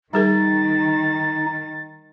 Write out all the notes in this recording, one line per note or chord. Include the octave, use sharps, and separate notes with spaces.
D#3 G3 D#4 G#4 A#4 A6